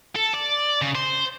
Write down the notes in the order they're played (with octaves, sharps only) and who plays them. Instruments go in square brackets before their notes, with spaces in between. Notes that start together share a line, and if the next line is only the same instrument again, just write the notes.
[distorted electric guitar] A4
D5
C#3
C5